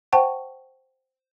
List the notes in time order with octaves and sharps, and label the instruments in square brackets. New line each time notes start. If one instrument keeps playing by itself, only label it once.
[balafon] C5 F#5 G5 A5 C#6